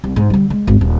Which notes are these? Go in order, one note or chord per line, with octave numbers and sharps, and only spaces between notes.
C2
G#2
D3 G3
G#3
G#1
D#1